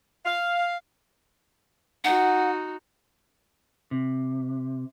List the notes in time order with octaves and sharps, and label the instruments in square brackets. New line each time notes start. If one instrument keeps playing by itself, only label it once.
[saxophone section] F5
[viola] D#4 F#4 [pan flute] F#5
[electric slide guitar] C3